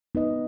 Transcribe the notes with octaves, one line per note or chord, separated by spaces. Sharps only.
B3 D#4 B4 D#5